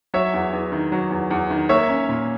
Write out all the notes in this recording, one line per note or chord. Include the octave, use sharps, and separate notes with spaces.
F#3 C#5 E5
E2
E2
D#3
F#3
E2
E2
D#3
A#3 C#5 E5
C#4
A#2